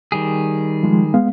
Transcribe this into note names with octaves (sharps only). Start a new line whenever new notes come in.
D#3 G3 G#4
F3 G#3
G#3 B3 F5